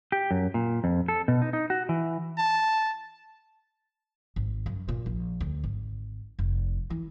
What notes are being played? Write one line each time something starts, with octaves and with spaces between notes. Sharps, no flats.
G4
F#2
A#2
F2
A4
B2
D#4
D#4
F#4
E3
A5
G#1
F#2
A#2
A#1
D2
G#1
F1
E3